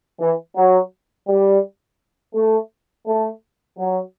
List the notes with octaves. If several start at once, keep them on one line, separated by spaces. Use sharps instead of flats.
E3
F#3
G3
A3
A3
F#3